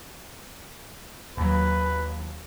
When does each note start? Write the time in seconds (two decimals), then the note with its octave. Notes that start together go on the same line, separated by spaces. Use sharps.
1.37 D#2 F#3 B4